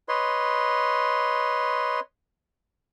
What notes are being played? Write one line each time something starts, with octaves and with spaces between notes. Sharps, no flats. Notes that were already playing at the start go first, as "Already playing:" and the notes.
B4 C#5 D#5 C6